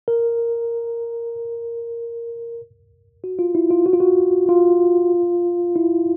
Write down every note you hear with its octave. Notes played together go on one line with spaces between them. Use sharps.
A#4
F#4
F4
E4
F4
F#4
F4
F#4
F4
E4